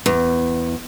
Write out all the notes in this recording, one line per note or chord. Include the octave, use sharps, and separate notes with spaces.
E2